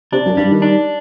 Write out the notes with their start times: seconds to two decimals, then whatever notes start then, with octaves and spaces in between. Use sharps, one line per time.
0.13 C3 D4
0.26 F#2
0.37 G2 G3
0.51 D#3
0.62 D4